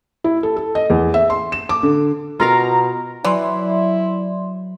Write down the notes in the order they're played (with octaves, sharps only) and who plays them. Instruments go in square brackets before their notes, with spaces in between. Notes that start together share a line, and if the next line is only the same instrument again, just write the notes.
[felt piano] E4
A4
A4
D#5
E2
E5
C6
E7
D6
D3
[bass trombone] B2 [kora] F4 A#4 F5 [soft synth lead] A#5
[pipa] E3 [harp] F#3 F#4 [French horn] E4 [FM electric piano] D5 C6